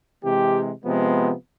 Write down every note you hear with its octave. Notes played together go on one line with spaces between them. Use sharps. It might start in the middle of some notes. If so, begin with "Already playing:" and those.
C3 E3 G#3 G4
C3 F3 G#3 B3